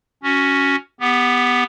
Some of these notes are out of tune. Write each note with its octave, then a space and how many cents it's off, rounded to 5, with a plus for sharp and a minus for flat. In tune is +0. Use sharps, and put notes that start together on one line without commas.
C#4 +10 F#4 +0
B3 +0 G4 +25